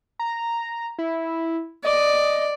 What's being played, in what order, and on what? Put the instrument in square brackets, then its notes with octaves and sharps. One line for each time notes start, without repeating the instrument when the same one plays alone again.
[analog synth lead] A#5
E4
[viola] D5 [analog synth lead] D#5